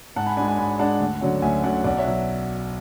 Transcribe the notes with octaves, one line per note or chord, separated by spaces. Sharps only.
G#2 F#5 A5
G#5 B5
G#3 D4 G#5 B5
G#5 B5
G#2 G#5 B5
G#3 D4 F#5 A5
D2
D3 F#3 C#4
D2 E5 G#5
D3 F#3 C#4 D5 F#5
B1 D5 F#5
C#5 E5
B2 F#3